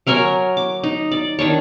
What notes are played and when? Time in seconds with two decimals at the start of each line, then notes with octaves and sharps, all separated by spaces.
0.07 F#3 A#4 C#5 G#5
0.57 D6
0.84 D#4
1.12 D5
1.39 D#3 D4 C#5